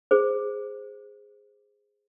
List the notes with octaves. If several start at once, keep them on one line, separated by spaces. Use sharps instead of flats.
G#4 C5